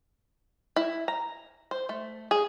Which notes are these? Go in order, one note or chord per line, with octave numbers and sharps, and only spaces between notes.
E4
A#5
C5
A3
G#4